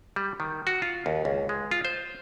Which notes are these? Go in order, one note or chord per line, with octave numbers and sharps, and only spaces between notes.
G3
D#3
F#4
F4
D#2
C#2
G#3
F4
C5